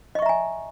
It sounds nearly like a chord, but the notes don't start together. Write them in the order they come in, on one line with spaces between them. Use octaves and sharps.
D#5 C#6 E5 A#5 G#5